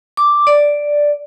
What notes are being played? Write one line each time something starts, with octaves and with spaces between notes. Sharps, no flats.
D6
D5